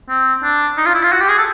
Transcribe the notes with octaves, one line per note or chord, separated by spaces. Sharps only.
C4
D4
D#4
F4
E4
F4
F#4
G4
G#4
A4